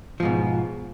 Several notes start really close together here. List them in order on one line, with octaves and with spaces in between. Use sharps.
F3 G#2 B2